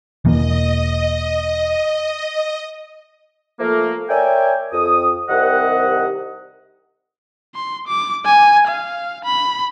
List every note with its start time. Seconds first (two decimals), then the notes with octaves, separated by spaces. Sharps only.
0.25 E1 E3 A#3 D#5
3.60 F3 A3 A#3
4.09 A#4 C#5 D5 E5 G5 G#5
4.72 F2 D#6
5.28 C2 C3 D#3 G3 D#5 F#5
7.55 C6
7.87 D6
8.25 G#5
8.67 F5
9.25 B5